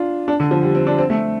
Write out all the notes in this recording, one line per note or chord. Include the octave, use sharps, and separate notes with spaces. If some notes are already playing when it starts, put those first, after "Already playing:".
Already playing: D4 F4
D4
D3
F3
G3
C4
D4
C4
A3